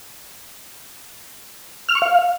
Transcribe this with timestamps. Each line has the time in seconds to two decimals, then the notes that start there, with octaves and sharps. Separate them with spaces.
1.89 F6
1.95 C#6
2.02 F5